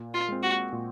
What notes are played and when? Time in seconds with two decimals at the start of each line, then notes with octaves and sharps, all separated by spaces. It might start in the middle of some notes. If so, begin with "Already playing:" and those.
Already playing: A#2
0.14 F4
0.28 G#3 C4
0.43 F#4
0.72 A#2